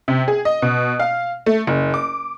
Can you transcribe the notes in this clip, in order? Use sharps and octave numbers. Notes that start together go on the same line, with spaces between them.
C3
G#4
D#5
B2
F5
A3
F#1
D6